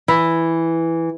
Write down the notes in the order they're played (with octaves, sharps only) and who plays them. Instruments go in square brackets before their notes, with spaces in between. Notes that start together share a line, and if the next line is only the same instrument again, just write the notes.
[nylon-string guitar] E3 [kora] E4